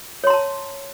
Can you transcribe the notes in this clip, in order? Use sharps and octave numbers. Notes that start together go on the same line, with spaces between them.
C#5 A5 A#5 C6